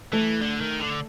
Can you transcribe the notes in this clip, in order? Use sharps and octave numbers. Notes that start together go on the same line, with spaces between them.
E3 A3
D3
D#3
D3